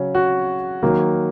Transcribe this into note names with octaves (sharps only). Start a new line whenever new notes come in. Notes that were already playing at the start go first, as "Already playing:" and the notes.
Already playing: C#3 F#3 C#4
F#4
D#3 F#3 A#3